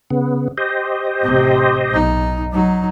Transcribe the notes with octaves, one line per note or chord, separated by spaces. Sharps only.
C#3 B3
G4 C5 D#5
A1 C3
B1 D#4
F#3 D#4